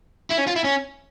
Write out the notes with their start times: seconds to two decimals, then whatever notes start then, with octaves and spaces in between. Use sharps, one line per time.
0.31 E4
0.39 C#4
0.47 F4
0.56 E4
0.64 C#4